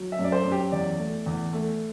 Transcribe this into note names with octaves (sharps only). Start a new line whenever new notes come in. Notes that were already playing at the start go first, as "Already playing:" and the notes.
Already playing: F#3
E5
F#2
D5
C5
F#2
G4
E2 D5
A3
E2
A3